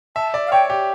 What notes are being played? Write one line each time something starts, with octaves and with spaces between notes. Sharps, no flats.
E5 A5
D5
F5
C#5 G5
G4